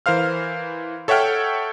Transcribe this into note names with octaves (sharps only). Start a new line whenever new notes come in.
E3 A#4 C5 F5 F6
A4 C#5 E5 F#5 G5 F6